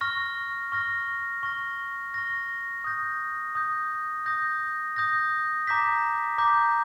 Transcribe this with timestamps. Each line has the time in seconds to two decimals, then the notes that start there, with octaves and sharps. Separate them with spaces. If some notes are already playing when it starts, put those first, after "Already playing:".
0.01 C#6 F6 A#6
0.72 C#6 F6 A#6
1.43 C#6 F6 A#6
2.14 C#6 F6 A#6
2.84 D#6 G6 A#6
3.55 D#6 G6 A#6
4.26 D#6 G6 A#6
4.96 D#6 G6 A#6
5.67 A#5 D6 G6 B6
6.38 A#5 D6 G6 B6